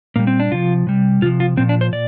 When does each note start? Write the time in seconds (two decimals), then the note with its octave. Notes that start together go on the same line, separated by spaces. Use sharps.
0.16 A#2 G3 A#3
0.27 C4
0.40 D4
0.52 C3 F3 F4
0.87 C3 G3
1.22 C3 F3 F4
1.40 F4
1.57 A#2 F3 C4
1.69 D4
1.81 C5
1.93 A#2 D5